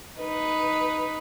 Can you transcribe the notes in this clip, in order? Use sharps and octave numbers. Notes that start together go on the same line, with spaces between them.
D#4 B4